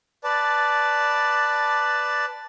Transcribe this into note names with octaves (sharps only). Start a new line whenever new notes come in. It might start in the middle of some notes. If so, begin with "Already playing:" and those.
B4 D5 A5